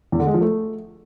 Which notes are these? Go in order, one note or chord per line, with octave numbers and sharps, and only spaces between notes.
E2
D3
G#3
F3
A3